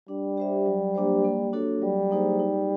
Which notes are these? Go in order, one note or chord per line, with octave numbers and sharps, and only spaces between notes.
G3 D4
G4 C5 E5
F#3
A#3 D4 G4 C5
A#3
D4 F#4 A4 C#5
F#3 G3
A#3 D#4 G#4 C5
D#4